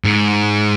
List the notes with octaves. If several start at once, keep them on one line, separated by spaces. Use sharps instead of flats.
G#2